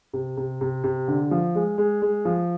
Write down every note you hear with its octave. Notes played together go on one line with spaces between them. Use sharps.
C3
C3
C3
C3
D3
F3
G#3
G#3
G#3
F3